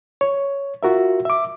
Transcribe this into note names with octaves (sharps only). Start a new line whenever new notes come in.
C#5
F4 F#4 A#4 E5
E5 D6